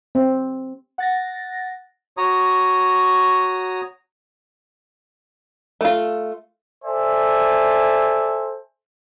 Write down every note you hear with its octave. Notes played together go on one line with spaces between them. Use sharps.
C4
F#5 A6 A#6
F#4 C#5 A#5 D#6
A3 F4
A4 C5 D5 E5 G#5